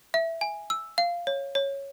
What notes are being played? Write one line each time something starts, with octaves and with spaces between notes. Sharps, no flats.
E5
G#5
E6
F5
C#5
C#5